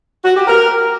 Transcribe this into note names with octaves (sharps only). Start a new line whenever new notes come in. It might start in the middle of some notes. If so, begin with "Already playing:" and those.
F#4
G4
A#4